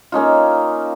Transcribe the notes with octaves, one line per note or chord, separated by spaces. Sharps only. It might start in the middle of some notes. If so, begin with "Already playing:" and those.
A#3 C#4 D#4 F4